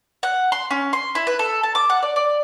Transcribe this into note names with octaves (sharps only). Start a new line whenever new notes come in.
F#5
C6
C#4
C6
E4
B4
A4
A5
D6
F#5
D5
D5